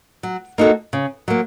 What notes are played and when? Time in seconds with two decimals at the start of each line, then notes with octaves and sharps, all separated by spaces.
0.23 F#3
0.58 A#3 D#4 F#4 A4
0.93 C#3
1.28 F#3 A#3